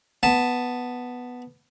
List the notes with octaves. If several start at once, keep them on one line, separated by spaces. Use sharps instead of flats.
B3 A5